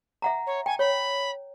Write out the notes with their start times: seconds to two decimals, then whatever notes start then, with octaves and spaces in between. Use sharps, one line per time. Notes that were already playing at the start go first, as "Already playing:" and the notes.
0.22 E5 F#5 A#5
0.46 C#5
0.66 G5 G#5
0.79 C#5 B5